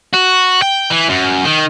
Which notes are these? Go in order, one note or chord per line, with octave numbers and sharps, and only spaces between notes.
F#4
G5
E3
F#2
D#3